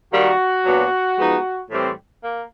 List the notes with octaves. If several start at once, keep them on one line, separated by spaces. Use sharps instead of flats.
D#3 G3 A#3 F#4
A#2 F#3 B3 D4
F3 G#3 B3 D#4
A2 E3 G3 C4
A#3